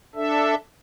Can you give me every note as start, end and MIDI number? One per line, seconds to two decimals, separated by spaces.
0.15 0.55 62
0.15 0.55 69
0.15 0.55 76